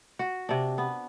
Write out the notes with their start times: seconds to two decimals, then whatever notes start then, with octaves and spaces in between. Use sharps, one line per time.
0.19 F#4
0.49 C3 D4
0.78 B3